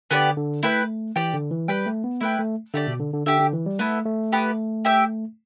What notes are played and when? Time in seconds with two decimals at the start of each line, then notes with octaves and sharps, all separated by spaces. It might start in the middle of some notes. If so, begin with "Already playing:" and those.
0.11 D3 B3 G4 D5
0.37 D3
0.63 A3 E4 B4 G5
1.16 E3 G4 D5 G5
1.34 D3
1.51 E3
1.68 G3 G4 B4 G5
1.86 A3
2.04 B3
2.21 A3 E4 B4 G5
2.39 A3
2.74 D3 A3 G4 D5
2.87 B2
3.00 D3
3.14 D3
3.26 D3 G4 E5 G5
3.40 D3
3.53 E3
3.66 G3
3.79 A3 B3 E4 A4
4.05 A3
4.32 B3 G4 B4
4.85 G4 E5 G5